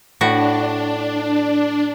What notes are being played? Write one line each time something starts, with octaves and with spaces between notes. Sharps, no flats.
A2 D4 F#4